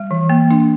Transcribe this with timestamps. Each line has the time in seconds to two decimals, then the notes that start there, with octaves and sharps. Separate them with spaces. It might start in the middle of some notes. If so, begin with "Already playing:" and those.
Already playing: G3
0.11 E3
0.30 A#3
0.51 D4